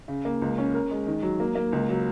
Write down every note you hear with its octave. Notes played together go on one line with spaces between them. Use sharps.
C#3
A#3
C#2
C#4
A#4
G#3
D#3
F#3
A#3
A#3
C#2
F#3